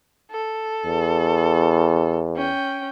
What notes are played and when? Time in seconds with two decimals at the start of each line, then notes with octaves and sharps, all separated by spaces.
0.31 A4
0.86 E2
2.36 C#4 G5